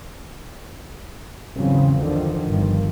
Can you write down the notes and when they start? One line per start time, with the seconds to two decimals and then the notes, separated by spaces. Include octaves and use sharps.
1.55 G#1 E2 C#3 F#3 C4
1.99 D3 D#3 F3
2.47 G1 G2 D#3 F3